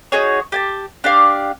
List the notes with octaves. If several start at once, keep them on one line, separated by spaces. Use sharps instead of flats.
D#4 F#4 G#4 C#5
G4 G#5 A5
D4 G4 D5 F5